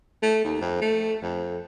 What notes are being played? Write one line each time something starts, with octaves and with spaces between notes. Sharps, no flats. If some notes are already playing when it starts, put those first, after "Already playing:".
A3
D#2
F2
A3
F2